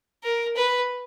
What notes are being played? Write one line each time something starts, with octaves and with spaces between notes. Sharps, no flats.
A#4
B4